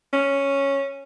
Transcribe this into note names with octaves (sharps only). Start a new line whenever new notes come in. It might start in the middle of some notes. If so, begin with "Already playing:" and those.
C#4